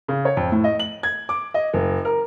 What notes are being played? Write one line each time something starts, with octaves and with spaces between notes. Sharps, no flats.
C#3
C#5
F2
A2
D#5
F#7
G#6
D6
D#5
F#1
A#4